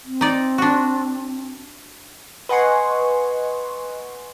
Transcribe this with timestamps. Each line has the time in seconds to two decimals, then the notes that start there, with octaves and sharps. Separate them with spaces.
0.05 C4
0.21 D#4 D5
0.58 D4 F#4
2.49 B4 D#5 F#5 G#5 C6 C#6